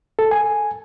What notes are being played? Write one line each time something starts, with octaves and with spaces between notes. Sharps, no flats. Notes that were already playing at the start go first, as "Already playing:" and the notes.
A4
G#5